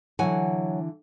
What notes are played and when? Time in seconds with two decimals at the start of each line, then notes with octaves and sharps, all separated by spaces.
0.19 D3 E3 F#3 F#5 G#5